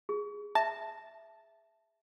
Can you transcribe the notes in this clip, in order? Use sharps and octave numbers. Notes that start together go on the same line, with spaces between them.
G#4
E5 A5